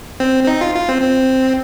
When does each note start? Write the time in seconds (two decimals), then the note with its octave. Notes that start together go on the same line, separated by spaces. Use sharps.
0.20 C4
0.43 C4
0.47 D#4
0.61 F4
0.75 F4
0.89 C4
1.02 C4